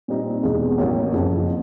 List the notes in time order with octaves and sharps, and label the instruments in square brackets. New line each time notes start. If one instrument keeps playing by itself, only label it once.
[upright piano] A#2 G3 C4 D#4
E2 B2 G#3
A1 A2 F#3 A#3
F#1 F2 C#3